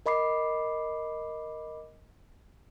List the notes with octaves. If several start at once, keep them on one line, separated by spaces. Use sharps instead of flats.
A#4 D#5 B5 D6 C7